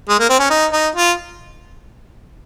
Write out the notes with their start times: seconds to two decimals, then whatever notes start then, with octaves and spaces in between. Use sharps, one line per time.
0.09 G#3
0.20 A#3
0.30 C4
0.39 C#4
0.50 D#4
0.72 D#4
0.96 F4